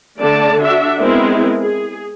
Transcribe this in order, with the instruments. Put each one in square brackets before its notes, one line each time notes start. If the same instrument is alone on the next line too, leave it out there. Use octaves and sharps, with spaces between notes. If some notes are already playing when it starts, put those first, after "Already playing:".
[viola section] D3 A3 D5 A5
D4 F#4 E5
G#3 B3 C4 E4 G#4 A#4
G#4